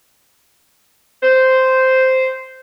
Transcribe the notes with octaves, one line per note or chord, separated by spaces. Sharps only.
C5